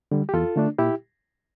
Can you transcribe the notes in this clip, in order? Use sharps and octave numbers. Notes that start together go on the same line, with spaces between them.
D3 G3
G4
E2 F4 A4
D3 A3 D4
A#2 E4 G4